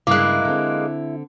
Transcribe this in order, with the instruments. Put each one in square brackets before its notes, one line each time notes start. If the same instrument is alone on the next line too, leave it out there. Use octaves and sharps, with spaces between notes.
[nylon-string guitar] G2 C#3 [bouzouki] G#3 A#3 [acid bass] E4 [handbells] D6 F#6
[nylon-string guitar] D3 C4